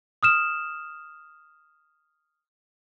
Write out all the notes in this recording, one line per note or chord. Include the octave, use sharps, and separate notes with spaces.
D#6 F6 E7